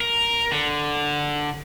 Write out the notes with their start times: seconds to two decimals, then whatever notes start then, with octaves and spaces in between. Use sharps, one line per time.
0.01 A#4
0.52 D3